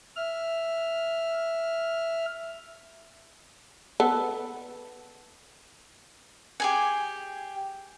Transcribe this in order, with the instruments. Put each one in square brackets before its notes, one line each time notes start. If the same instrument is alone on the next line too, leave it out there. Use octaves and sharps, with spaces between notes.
[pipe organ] E5 F6
[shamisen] B3 A4
[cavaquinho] G4 G#4 G#5